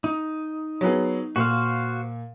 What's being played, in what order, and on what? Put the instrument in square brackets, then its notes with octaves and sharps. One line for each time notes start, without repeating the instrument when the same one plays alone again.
[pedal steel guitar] D#4
[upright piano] F#3 B3 G#4
[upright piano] A#2 [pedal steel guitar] F#4 C5 F5